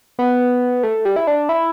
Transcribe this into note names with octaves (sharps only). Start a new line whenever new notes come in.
B3
A3
G3
E4
D4
E4